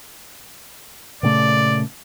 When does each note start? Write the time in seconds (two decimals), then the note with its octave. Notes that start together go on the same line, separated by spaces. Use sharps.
1.23 A#2 C#3 A3 D5